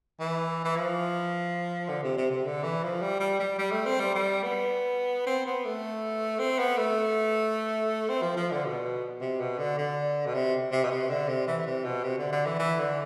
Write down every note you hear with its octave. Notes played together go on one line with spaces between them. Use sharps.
E3
E3
F3
D3
C3
C3
C3
D3
E3
F3
G3
G3
G3
G3
A3
C4
G3
G3
B3
C4
B3
A3
C4
B3
A3
C4
F3
F3
D3
B2
C3
B2
D3
D3
B2
C3
C3
B2
C3
D3
C3
E3
C3
B2
C3
D3
D3
E3
E3
D3